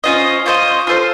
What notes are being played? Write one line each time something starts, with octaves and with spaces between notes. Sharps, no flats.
C#4 F4 C5 D#5
C#4 F4 C5 D#5
F4 A4 C5